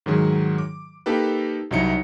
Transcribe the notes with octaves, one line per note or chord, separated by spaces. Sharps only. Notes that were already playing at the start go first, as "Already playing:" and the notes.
G#2 D#3 F#3 G#4
D6
A#3 D#4 G4 A4 B4
C2 C3 F#3 D#4 E4 C#7